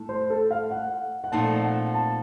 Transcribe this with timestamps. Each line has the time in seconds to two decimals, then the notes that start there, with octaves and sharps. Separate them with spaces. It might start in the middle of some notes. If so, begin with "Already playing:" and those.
Already playing: A2 A3
0.09 C5
0.30 A4
0.51 F5
0.71 F#5
1.24 F#5
1.32 A#2 F3 A3 C4 D#4 A5
1.63 F#5
1.94 A5